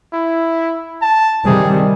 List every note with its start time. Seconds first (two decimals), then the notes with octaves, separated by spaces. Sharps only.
0.13 E4
1.02 A5
1.46 C3 D#3 G3 G#4